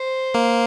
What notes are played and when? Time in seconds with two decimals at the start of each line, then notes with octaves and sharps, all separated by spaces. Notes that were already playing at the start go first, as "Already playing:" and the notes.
Already playing: C5
0.34 A#3